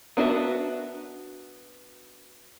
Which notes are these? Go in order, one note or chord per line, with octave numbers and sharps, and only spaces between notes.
B3 D4 F#4 D#5 E5